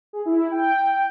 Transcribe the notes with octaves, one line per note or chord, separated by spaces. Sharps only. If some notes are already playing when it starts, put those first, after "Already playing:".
G#4
E4
G5